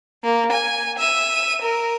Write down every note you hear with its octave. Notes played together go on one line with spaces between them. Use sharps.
A#3
G#5
E5 D#7
A#4